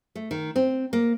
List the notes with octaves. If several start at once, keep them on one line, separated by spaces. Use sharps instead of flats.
A3
D#3
C4
A#3